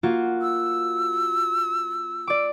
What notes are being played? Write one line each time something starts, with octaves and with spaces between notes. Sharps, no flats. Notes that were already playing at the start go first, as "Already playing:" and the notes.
A#3 F4 F#4
E6
D5 D6